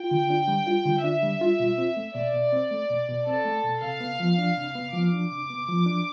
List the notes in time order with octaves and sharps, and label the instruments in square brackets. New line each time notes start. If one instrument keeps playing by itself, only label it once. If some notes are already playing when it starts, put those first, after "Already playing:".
Already playing: [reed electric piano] F4 [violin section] G5
[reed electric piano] D3
D4
G3
F4
D3
[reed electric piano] D4 [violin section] E5
[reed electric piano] G3
F4
B2
C4
A3
[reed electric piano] B2 [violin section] D5
[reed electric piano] B2
C4
A3
B2
B2
[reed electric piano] C4 [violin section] A4
[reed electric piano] A3
B2
[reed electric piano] C3 [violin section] F5
[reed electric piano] B3
F3
D4
C3
B3
[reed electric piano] F3 [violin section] D6
[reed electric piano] D4
C3
B3
F3
D4